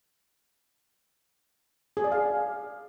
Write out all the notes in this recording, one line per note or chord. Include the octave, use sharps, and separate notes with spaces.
G#4
D5
F5